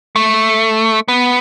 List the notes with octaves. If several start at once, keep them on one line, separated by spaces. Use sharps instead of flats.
A3
B3